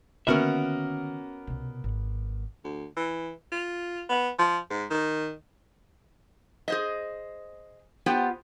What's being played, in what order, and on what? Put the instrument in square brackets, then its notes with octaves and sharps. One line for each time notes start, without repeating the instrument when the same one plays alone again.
[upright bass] D3 D#3 [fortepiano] A#3 B3 A#4 [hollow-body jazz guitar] C#4 F#4 E5
[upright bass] C2 B2
G#1
[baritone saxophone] D2
E3
F4
B3
F3
G#2
D#3
[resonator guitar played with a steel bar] G#4 C5 D#5
B3 F4 G4 C5 G5